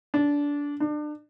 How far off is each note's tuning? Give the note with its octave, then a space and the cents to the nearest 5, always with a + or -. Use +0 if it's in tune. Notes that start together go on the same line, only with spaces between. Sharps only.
D4 -20
D4 +30